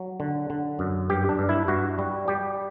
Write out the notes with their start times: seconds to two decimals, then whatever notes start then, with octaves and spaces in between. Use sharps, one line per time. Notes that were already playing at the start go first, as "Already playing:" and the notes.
Already playing: F#3
0.20 D3
0.50 D3
0.79 F#2
1.10 G2 G4
1.29 D4
1.39 G2
1.49 E4
1.68 G2 F#4
1.99 G3
2.28 G3 G4